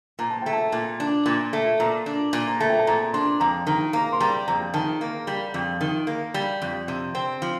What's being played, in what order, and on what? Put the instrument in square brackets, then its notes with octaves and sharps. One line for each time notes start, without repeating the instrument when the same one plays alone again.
[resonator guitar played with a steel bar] A#2 [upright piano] A#5
[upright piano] A5
[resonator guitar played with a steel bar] A3 [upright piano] G5
[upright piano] A5
[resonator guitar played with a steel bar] A#2
D4
A#2
A3
[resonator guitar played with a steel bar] A#2 [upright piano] A#5
[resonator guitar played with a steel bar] D4
A#2
[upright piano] A#5
[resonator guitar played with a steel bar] A3 [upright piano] A5
[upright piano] G5
A5
[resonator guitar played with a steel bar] A#2 [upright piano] A#5
[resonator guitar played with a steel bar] D4 [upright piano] C6
[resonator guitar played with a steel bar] F2 [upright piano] A#5
[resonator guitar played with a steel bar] D#3 [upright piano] A#5
[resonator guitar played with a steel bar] A#3 [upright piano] A#5
[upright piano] C6
[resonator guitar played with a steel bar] G3 [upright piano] A#5
[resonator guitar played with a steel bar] F2 [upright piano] A#5
[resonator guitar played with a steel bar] D#3 [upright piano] A5
[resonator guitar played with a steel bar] A#3
G3
F2
D#3
A#3
G3
F2
C3
C4
F3